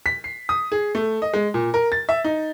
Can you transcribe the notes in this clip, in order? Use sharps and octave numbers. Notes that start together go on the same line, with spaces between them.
B6
C7
D#6
G#4
A3
D#5
G#3
A#2
A#4
A6
E5
D#4